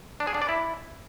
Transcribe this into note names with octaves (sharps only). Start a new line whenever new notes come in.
D4
G#4
D4
D5
E4